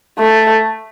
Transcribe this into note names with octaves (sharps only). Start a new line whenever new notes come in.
A3